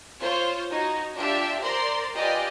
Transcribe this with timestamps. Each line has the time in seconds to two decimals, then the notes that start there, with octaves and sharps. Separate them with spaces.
0.21 F4 C5 C#5
0.70 D#4 F#4 G#6
1.16 D4 F4 G4 E5
1.62 A#4 C5 D5 A#5 C6
2.15 F4 G4 B4 D5 D#5 G#5